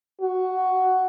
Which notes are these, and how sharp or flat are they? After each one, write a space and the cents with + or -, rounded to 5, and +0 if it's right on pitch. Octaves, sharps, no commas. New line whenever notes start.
F#4 +5